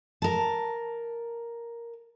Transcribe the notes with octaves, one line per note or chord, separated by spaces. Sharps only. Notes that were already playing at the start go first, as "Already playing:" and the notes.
A#4 A5